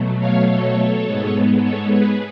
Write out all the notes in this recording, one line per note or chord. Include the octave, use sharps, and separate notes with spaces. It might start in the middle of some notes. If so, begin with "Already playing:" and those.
Already playing: B2 F#3 A3
C#5 F5
A4 C#5
G#2 G#3 B3
A4 C#5
G#4 B4